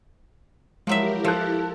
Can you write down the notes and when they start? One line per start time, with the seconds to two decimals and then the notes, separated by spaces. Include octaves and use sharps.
0.87 F3 F#3 G#3 E4 G4 A#4 E5
1.25 F3 A4 A5 F#6